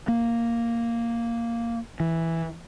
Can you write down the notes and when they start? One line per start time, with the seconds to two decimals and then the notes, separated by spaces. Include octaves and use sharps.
0.08 A#3
2.00 E3